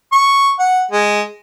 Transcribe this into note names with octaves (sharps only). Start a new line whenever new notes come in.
C#6
F#5
G#3